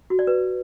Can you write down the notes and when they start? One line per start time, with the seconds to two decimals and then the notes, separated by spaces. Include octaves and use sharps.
0.10 F#4
0.19 D5
0.27 B4